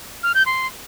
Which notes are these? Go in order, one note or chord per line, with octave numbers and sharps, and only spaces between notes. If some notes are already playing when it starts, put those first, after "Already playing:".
F6
G6
C6